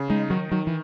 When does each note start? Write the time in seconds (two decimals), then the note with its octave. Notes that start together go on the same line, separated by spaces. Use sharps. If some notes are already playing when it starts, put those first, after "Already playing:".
Already playing: C#3
0.10 G#3 D#4
0.30 D#3 F#3
0.52 D#3 F#3
0.67 E3